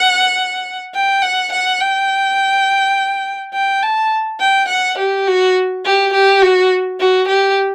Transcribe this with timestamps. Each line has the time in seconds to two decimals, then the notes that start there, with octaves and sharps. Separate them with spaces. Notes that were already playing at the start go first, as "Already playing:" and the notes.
Already playing: F#5
0.94 G5
1.22 F#5
1.52 F#5
1.80 G5
3.53 G5
3.83 A5
4.40 G5
4.68 F#5
4.98 G4
5.27 F#4
5.85 G4
6.13 G4
6.42 F#4
7.00 F#4
7.28 G4